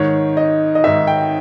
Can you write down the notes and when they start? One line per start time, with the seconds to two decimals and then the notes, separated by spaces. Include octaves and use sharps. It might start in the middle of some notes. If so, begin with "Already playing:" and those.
Already playing: G#2 D#3 C#5
0.37 D#5
0.75 D#5
0.84 G#2 D#3 E5
1.07 G5